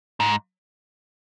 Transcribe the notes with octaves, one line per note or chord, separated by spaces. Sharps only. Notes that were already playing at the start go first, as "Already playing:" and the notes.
G#2